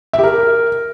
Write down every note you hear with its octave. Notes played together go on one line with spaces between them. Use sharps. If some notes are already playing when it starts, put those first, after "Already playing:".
E5
G4
A#4